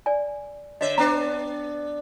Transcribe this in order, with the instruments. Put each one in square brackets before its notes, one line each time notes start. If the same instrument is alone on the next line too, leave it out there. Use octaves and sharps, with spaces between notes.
[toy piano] D5 G#5
[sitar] D3 E5 [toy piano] C#5 D#5
[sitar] B3 D4 [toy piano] A#5